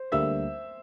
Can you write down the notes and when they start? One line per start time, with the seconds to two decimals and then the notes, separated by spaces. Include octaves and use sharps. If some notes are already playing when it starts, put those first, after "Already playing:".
Already playing: C5
0.12 D2 D3 G3 A#3 E5 E6